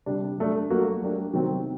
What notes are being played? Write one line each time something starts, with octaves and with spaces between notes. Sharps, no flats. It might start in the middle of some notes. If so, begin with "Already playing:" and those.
C3 G3 D4
F#3 A3 D4
F#3 A#3 F#4 A4
F#3 A3 D4 G4 A#4
C3 D#3 F#3 C4